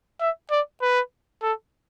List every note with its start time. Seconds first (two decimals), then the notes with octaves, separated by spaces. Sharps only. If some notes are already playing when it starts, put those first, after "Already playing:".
0.21 E5
0.51 D5
0.82 B4
1.43 A4